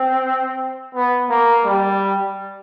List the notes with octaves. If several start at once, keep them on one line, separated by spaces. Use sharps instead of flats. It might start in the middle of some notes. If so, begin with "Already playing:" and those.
Already playing: C4
B3
A#3
G3